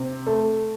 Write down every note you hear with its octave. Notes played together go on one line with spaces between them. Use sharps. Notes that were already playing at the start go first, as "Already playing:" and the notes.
Already playing: C3
A3